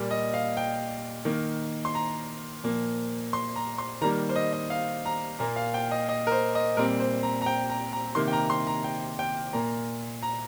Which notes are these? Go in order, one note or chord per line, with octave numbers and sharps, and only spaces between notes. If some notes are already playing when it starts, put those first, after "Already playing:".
Already playing: A#2 G3 A#3
D#5
F5
G5
D#3 A#3
C6
A#5
A#2 F3 A#3
C6
A#5
C6
D#3 G3 A#3 A#5
C5
D#5
D#5
F5
A#5
A#2 A#3 A#5
F5
G5
D#5
D#5
A#4
C5
D#5
A#2 G3 C4 A#4
C5
A#5
A#5
G5
A#5
A#5
C3 D#3 A#3 C6
G5
A#5
C6
A#5
G5
G5
A#2 A#3 A#5
A#5